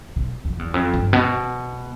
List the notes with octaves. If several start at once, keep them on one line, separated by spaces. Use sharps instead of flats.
B2
F2
E2
F2
G2
B2